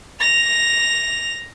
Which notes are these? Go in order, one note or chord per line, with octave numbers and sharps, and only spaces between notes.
A#6 F7